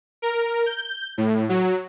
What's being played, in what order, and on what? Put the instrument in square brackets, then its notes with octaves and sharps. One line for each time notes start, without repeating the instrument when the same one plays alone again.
[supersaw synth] A#4
G6
A2
F#3